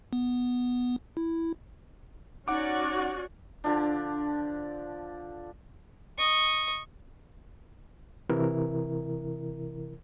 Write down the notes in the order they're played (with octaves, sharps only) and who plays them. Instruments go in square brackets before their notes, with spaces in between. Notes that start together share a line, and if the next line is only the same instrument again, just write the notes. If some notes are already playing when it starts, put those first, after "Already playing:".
[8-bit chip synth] B3
E4
[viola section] C#4 F#4 D5 [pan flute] D#4 [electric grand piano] F#5 D6
[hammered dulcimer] D3 F3 D4
[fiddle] D#5 C#6
[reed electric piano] C3 E3 E4 A#4